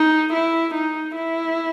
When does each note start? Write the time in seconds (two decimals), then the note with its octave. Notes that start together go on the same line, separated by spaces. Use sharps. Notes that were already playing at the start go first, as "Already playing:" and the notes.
Already playing: D#4
0.33 E4
0.75 D#4
1.16 E4